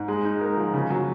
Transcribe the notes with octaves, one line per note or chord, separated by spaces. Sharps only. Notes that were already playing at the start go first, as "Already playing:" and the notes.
Already playing: G#2
G#3
D#4
A#4
F3
C#3
F#3